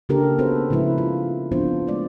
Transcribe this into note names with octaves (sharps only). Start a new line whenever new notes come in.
C#3 A#3 D4 G4 A4 A#4
B3 C4 F#4 A4 B4 C5
C#3 F3 G#3 E4 B4
F4
F3 B3 C4 D4 F4 C5
G#3 A3 D5